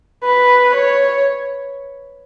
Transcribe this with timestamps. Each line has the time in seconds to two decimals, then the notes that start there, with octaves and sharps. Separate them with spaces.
0.24 B4
0.75 C#5